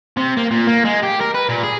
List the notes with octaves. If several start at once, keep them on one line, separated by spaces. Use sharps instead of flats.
C3
A#3
A#2
A#3
G#3
G4
A#4
B4
A#2
G#4